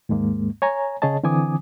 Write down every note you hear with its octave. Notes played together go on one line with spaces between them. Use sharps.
D#2 G#2 G#3 A#3
C#5 G#5 A#5
C#3 G#4 C#5 D#5 A5
D3 E3 C4 G#5 D6 D#6